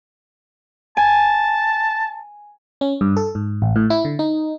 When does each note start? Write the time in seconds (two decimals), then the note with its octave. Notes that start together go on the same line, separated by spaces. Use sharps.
0.97 G#5 A5
2.81 C#4
3.01 G2
3.17 A4
3.35 G#2
3.62 A1
3.76 A2
3.90 E4
4.05 D3
4.19 D#4